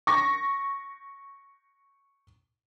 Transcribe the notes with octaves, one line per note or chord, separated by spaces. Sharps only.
C#6 A#6